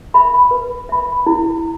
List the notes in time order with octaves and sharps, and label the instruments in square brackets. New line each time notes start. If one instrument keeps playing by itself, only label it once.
[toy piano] E5 B5
B4
E5 B5
E4